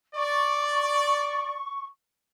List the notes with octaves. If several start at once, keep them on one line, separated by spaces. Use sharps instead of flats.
D5 C#6